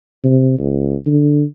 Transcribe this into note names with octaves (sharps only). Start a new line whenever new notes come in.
C3
C#2
D3